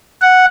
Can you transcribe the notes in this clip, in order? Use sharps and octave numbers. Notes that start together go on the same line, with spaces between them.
F#5